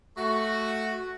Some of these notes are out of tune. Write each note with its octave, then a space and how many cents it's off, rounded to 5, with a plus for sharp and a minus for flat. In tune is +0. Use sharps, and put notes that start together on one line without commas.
A3 -5 F#4 +0